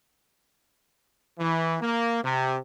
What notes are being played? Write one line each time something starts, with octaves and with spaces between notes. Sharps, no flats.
E3
A#3
C3